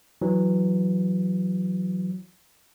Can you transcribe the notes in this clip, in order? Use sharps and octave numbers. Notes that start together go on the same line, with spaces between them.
E3 F#3